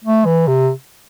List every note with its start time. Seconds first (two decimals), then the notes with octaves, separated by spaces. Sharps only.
0.04 A3
0.25 E3
0.47 C3